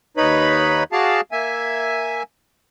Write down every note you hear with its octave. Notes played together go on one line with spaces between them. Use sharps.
D#2 D#4 B4 C#5 B5
F#4 G#4 D5 F5 A5
A#3 E5 G#5